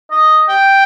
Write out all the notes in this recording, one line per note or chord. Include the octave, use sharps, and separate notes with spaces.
D#5
G5